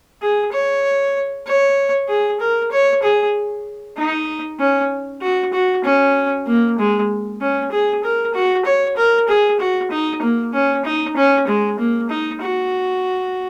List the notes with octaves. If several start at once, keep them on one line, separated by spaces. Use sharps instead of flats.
G#4
C#5
C#5
G#4
A#4
C#5
G#4
D#4
C#4
F#4
F#4
C#4
A#3
G#3
C#4
G#4
A#4
F#4
C#5
A#4
G#4
F#4
D#4
A#3
C#4
D#4
C#4
G#3
A#3
D#4
F#4